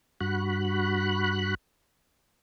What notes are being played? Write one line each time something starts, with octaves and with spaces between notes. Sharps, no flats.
G2 F#4 B5 F#6